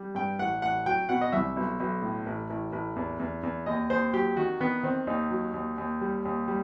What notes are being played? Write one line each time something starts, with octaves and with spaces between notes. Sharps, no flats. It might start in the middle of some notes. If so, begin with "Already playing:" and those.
Already playing: G3
G2 G5
A1 F#5
A1 F#5
F#3 G5
B2 F#5
D#5
C2 E5
B1
B1
A2
A1
A1
A1
E2
E2
E2
D#2 D#5
D#2 C5
F#3 G4
D#3 F#4
D#3 B3
D#3 C4
D#2 D#4
F#3
D#2
D#2
G3
D#2
G3